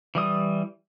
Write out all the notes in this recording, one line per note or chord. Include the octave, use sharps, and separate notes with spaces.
E3 G3 D#6